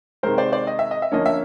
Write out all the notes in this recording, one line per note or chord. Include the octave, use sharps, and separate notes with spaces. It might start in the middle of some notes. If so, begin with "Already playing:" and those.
C3 D#3 G#3 A#4 C5
C5 D5
C5 D5
D#5
E5
D#5
E5
D3 F3 A#3 C#4 D#5
E5